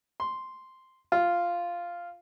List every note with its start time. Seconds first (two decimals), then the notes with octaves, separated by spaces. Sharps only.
0.20 C6
1.12 F4